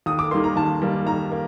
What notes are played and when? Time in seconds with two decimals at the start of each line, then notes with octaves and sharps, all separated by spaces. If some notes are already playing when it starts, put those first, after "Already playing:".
0.06 D#2 D#6
0.19 D6
0.31 D#3 G3 A#3 C6
0.44 A#5
0.56 D#2 A5
0.82 D#3 G3 A#3
1.07 D#2 A#5
1.32 A#3